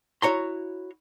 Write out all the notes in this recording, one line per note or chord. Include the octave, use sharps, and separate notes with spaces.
E4 F#4 C#5 A#5 C6